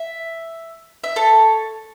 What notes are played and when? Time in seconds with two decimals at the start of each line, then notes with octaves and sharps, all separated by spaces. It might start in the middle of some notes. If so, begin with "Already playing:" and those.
Already playing: E5
1.04 E5
1.16 A4 C#5